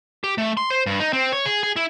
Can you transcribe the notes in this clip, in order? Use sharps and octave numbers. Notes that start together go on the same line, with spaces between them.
G4
A3
C6
C5
G2
D#4
C4
C#5
G#4
G#4
E4